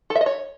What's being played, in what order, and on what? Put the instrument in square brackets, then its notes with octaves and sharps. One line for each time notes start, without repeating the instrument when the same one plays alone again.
[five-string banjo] A4
E5
D#5
C#5